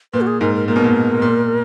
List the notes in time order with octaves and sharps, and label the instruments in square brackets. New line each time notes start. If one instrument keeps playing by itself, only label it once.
[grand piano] A#2 [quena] B4
[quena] F#4
G#4
[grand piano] G#2 [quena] A#4
[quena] A#4
[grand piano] A#2 [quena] A#4
[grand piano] B2
A#2
A#2